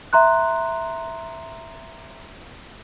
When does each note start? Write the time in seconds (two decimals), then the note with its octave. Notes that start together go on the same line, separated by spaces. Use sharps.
0.13 E5 A#5 C6 F#6